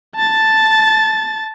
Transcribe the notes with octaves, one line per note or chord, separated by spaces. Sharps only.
A5 A6